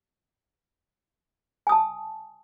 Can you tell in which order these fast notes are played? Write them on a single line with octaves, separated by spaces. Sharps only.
G#5 D#6 A5